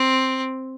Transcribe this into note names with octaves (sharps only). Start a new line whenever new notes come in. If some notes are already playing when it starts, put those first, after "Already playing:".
Already playing: C4